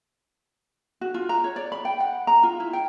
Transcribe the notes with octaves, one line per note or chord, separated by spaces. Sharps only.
F#4
F4
A#5
C#5
D5
B5
G5
F#5
A#5
F4
E4
G5